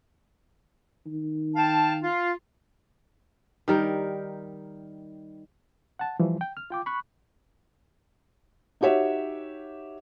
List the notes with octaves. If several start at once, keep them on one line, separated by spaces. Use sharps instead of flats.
D#3
F5 G5 A5
F4
D#3 G3 A#4
F#5 A5
E3 F3 G3
G5
F6
F4 G5 D6
B5 C#6 F#6
D#4 F#4 G4 C#5 E5 F#5